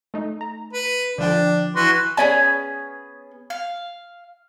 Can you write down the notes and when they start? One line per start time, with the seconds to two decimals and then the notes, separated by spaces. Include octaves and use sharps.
0.14 A3 D#4
0.41 A#5
0.73 B4
1.18 D3 F3 D4 G5
1.76 E3 F#4 B4 C6
2.17 B3 C#4 G#4 C#5 D5 G#5
3.50 F5